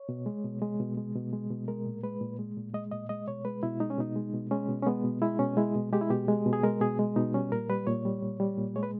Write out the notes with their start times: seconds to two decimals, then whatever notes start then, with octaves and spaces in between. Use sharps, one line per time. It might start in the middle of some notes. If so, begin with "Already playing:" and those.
Already playing: C#5
0.09 B2
0.26 G#3
0.44 B2
0.62 G#3
0.80 B2
0.97 G#3
1.15 B2
1.33 G#3
1.50 B2
1.68 G#3 A#4
1.86 A#2
2.03 G#3 B4
2.21 A#2
2.39 G#3
2.57 A#2
2.74 G#3 D#5
2.91 A#2 D#5
3.09 G#3 D#5
3.27 B2 C#5
3.45 G#3 B4
3.63 B2 E4
3.80 G#3 D#4
3.90 C#4
3.98 B2 D#4
4.16 G#3
4.33 B2
4.51 G#3 C#4
4.69 B2
4.82 C#4
4.87 G#3 B3
5.04 B2
5.22 G#3 E4
5.39 B2 C#4
5.57 G#3 E4
5.75 B2
5.93 G#3 G4
6.01 E4
6.10 B2 G4
6.28 G#3
6.46 B2
6.53 G#4
6.64 G#3 A#4
6.81 B2 G#4
6.99 G#3
7.16 B2 D#4
7.34 G3 C#4
7.52 A#2 A#4
7.69 G3 B4
7.87 A#2 C#5
8.05 G3
8.22 A#2
8.40 G3
8.58 A#2
8.76 G#3 C#5
8.83 B4